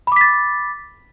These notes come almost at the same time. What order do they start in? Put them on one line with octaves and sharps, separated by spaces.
B5 D6 B6 A6